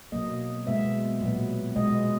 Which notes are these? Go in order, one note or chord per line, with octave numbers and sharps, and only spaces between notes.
B2 F#3 A#3 D#5
B2 G#3 B3 E5
A#2 F#3 B3
B2 G#3 B3 D#5